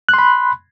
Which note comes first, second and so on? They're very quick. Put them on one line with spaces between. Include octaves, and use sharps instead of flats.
F#6 C6 B5